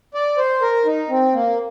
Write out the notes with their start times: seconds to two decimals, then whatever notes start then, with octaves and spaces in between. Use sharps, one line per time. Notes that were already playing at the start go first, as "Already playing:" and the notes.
0.14 D5
0.38 C5
0.62 A#4
0.85 D#4
1.09 C4
1.33 A#3